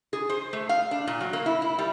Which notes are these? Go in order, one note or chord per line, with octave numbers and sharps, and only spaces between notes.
G#4
C5
A3
F5
D4
A#2
F#3
A#3
E4
E4
G3